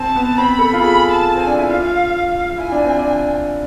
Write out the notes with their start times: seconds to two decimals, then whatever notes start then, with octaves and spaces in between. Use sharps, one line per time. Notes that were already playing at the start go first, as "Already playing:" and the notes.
Already playing: C4 A5
0.16 B3
0.37 C4 B5
0.59 A4
0.73 F4
0.81 G#4 B5
1.11 A5
1.35 C4 G#5
1.47 D4
1.58 E4
1.69 F4 F5
2.58 E4 G#5
2.72 D4
2.85 C4
2.99 D4